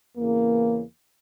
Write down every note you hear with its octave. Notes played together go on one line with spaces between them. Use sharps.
E2 C#3 E3 A#3